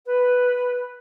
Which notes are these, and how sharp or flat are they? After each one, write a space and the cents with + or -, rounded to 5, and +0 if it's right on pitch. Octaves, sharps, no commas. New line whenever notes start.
B4 +0